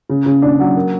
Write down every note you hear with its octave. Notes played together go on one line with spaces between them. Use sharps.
C#3
C#3
D4
F#3
A#3